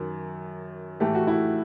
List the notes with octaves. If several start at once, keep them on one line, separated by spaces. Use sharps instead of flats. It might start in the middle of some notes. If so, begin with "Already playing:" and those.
Already playing: F#2 D#3 F#3
A2 E3 A3 G4
F#4
E4